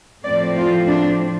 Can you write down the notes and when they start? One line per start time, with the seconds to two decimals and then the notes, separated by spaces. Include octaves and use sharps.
0.24 A2 F3 A3 C4 D5
0.56 F4
0.87 D4